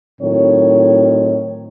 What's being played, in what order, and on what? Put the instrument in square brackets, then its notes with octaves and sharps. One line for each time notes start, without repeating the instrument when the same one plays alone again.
[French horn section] A2 D#3 F#3 C4 C#5